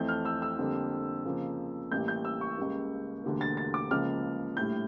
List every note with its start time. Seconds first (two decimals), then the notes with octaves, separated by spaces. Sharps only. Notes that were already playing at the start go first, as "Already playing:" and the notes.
Already playing: F2 E3 A3 G6
0.08 F6
0.25 E6
0.42 E6
0.59 F2 D3 G3 A#3
1.25 F2 C#3 F3 A#3
1.91 A1 A2 G3 A#3 G6
2.08 G6
2.25 E6
2.41 C#6
2.58 C#2 C#3 G3 A#3
3.24 E1 D2 D3 G3 A#3
3.41 A6
3.57 A6
3.74 D6
3.90 C#2 C#3 F3 A#3 F6
4.57 A#1 A2 G3 G6